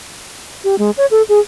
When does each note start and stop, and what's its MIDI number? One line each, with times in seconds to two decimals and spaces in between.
0.64 0.78 67
0.78 0.91 56
0.97 1.06 73
1.11 1.22 69
1.29 1.40 68